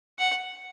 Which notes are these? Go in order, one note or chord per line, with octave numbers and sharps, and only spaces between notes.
F#5